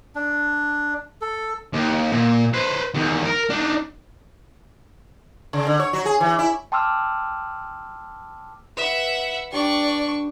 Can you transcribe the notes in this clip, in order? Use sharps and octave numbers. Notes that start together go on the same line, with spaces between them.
D4
A4
D#2
A#2
B4 C5
E2 D#3
A#4
D4 D#4
C#3
D3
C#5
F#3
G#4
E3
E4
G5 A5 C6 D6 E6 F6
B4 E5 F#5
G3 D4 D5 C#6